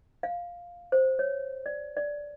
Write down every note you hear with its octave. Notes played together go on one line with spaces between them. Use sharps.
F5
C5
C#5
D5
D5